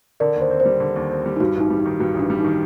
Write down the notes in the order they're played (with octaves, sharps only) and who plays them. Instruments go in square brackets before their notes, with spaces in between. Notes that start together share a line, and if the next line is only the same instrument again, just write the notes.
[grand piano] D3 [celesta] A#4 D5
[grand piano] D#2
[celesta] C5
[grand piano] C4
[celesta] C5
[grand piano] G3
D3
D#2
C4
G3
[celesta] D#4
[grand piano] G2 [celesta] F#4
[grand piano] A1 [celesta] D#4
[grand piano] G3
[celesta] D#4
[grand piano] D#3
[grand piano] G2 [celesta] F#4
[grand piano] A1 [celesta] D4
[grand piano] G3
[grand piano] D#3 [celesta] D#4